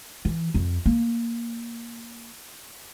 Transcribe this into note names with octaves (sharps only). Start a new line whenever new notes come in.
E3
F2
A#3